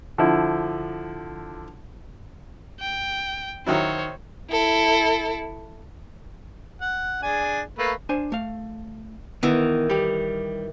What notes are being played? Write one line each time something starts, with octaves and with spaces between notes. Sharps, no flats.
D3 F3 E4
G5
D#3 F#3 E4 C5 C#5
E4 A4
F#5
D4 G#4 G#5
A3 A#3 B4
D4 C5 G#5
A3 F5
D#3 E3 B3 E4
G3 G4